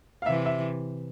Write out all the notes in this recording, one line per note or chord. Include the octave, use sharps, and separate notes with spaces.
F5
C3 E3 E5
E5